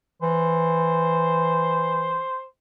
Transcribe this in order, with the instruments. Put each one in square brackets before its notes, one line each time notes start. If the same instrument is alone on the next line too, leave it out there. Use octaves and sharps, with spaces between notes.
[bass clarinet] E3 [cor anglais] C5